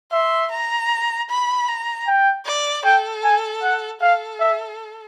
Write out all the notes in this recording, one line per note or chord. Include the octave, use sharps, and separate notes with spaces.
E5 C6
A#5
B5
A#5
G5
D5
A4 G5
G#5
F#5
A4 F5
E5